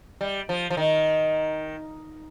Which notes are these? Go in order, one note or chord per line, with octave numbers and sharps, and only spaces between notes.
G3
F3
F3
D#3